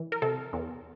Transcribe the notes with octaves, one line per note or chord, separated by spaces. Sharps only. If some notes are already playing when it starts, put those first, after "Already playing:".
Already playing: E3
A#4
C3 A4
E2